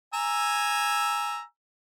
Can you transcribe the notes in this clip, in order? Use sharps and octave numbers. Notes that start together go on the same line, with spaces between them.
G#5 A#5 E6